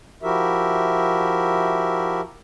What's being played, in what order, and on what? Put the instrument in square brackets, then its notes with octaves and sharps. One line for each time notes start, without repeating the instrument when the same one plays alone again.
[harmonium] F3 E4 F#4 G4 A#4 E5